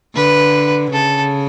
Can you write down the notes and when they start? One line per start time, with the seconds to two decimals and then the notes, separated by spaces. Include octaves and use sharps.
0.15 D3 B4
0.93 C#3 A4